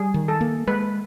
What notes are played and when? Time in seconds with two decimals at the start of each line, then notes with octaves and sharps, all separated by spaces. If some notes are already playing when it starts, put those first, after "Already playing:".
Already playing: G3 G#4
0.14 D#3
0.28 A4
0.41 A#3
0.67 G#3 B4